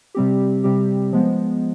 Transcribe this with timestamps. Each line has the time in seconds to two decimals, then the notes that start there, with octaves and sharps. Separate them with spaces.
0.15 C3 G3 C4 G4
0.64 C3 G3 C4 G4
1.13 F3 G#3 B3